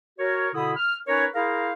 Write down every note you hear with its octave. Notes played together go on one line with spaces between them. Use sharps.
F#4 A#4 C#5
B2 D3 E4 B5 D#6
F6
C#4 D#4 A#4 B4 C#5
E4 G#4 A#4 C5 F5